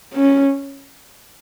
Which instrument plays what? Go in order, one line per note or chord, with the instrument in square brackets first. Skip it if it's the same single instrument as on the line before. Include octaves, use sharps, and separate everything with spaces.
[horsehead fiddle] C#4